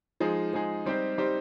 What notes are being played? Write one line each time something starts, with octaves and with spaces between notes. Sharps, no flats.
F3 G#3 D#4 G#4
F3 G#3 D#4 G#4
G3 C4 D#4 G4 C5
G3 C4 D#4 G4 C5